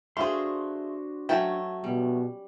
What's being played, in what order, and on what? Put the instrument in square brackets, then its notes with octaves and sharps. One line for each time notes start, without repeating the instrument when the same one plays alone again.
[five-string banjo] A3 G#4 [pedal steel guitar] D4 F#4 C6 [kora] C5 F5
[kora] F#3 C#4 [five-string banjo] A3 G5 A5
[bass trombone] B2 [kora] G3